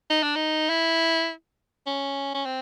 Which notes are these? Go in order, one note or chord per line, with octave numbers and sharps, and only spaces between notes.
D#4
D4
D#4
E4
C#4
C#4
C4